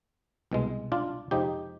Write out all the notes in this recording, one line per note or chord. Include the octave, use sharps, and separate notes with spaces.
C2 B2 G#3
D4 F4
F2 C3 F3 G#3 D#4 G4